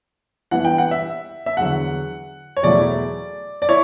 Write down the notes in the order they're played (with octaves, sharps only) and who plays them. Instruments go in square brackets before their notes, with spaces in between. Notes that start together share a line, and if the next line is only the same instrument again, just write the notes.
[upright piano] G2 E3 B3 E4 F#5
G5
F#5
E5
E5
E2 D3 F#3 F#5
C#5
E2 B2 F#3 A3 E4 D5
D5
E4 C#5